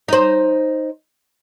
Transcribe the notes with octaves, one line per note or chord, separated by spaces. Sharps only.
D#4 C5